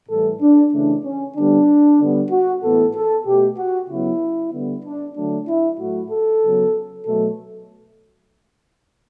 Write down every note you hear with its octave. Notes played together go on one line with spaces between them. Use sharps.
A2 E3 G3 A4
D4
C#3 E3 A3 D4
C#4
D3 G3 B3 D4
D3 G3 B3
F#4
A2 E3 B3 A4
A4
B2 A3 G4
F#4
C#3 F#3 B3 E4
D3 G3 B3
D4
D3 F#3 A3 D4
E4
A2 F#3 A3 F#4
A4
C#3 F#3 B3
B2 F#3 A3 A4